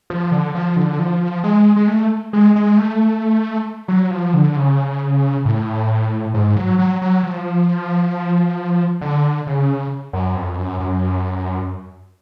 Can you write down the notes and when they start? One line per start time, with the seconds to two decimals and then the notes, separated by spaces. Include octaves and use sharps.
0.10 F3
0.32 D3
0.55 F3
0.76 D3
0.99 F3
1.44 G#3
1.76 G#3
1.88 A3
2.33 G#3
2.56 G#3
2.78 A3
3.88 F#3
4.11 F3
4.34 D3
4.56 C#3
5.45 A2
6.34 G#2
6.56 F#3
6.79 F#3
7.02 F#3
7.23 F3
9.01 D3
9.47 C#3
10.13 F#2
10.36 F2
10.58 F#2
10.80 F#2